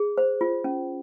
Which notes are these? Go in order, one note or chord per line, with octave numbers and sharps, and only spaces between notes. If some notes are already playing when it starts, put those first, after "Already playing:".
Already playing: G#4
C5
F4
C#4